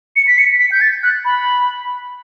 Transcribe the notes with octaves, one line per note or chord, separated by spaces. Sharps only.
C#7
B6
C#7
B6
G6
A6
F#6
B5